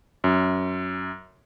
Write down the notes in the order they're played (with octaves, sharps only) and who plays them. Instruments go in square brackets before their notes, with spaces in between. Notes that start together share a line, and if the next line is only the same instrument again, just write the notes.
[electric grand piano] F#2